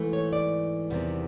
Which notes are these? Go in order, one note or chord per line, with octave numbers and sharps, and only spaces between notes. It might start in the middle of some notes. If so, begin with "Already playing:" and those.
Already playing: G#2 E3 A3
C#5
D5
E2 C3 D#3 G3 B3